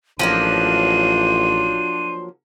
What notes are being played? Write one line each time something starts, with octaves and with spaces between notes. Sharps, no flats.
A1 F3 F#3 A#3 D4 C5 D#7